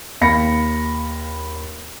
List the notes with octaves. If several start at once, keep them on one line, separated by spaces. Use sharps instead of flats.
D#2 F5 B5 A#6 C#7